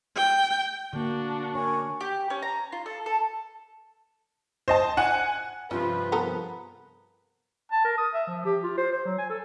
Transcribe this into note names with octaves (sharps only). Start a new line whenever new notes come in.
G5
D3 A#3 D4 F#4
A#4 C#5 G#5 C#6
G4
C#4
A#5
F4
A4
A4
C5 D#5 A5
F#5 G#5 F#6
G2 C3 F3 C#4 F4 B4
B3 A4 A#4
A5
A#4
D#6
E5
F3
G4
F4
C5
C5
F#3
G#5
A4